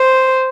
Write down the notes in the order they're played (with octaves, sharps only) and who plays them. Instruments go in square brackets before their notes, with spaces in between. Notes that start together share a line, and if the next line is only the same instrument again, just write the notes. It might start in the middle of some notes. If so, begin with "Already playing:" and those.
Already playing: [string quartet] C5